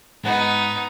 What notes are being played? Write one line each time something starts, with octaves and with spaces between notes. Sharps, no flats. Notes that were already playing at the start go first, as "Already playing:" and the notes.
G#2 B3 D#4 F#5